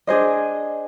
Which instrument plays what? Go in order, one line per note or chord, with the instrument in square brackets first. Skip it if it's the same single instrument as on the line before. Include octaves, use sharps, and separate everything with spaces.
[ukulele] D4 G#4 C5 D#5